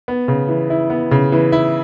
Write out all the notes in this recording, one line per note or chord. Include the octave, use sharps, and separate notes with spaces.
B3
C#3
E3
E4
B3
C#3
E3
E4